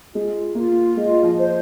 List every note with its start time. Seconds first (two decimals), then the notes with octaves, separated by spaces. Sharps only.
0.14 G#3 F4
0.55 A#3 F4
0.96 G#3 D#5
1.23 F3
1.38 C5